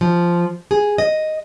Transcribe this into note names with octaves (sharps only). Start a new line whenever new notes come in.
F3
G#4
D#5